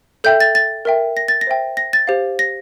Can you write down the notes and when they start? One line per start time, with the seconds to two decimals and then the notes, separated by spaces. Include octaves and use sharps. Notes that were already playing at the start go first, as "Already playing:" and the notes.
0.24 A4 E5 G5 G6
0.40 A6
0.55 A6
0.85 A#4 E5 G5
1.17 A#6
1.28 A6
1.41 A#6
1.47 C5 E5 G5
1.77 A#6
1.93 A6
2.07 G4 C5 F5
2.39 A#6